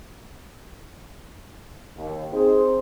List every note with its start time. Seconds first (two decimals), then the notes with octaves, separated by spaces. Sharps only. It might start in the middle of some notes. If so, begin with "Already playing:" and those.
1.97 D#2
2.33 C4 D#4 G#4 C5